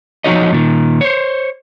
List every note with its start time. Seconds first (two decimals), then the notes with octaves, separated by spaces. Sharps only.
0.24 F3 G#3 D#4 F#4 C#5 D#5
0.52 A#2 D#3
1.01 C5 C#5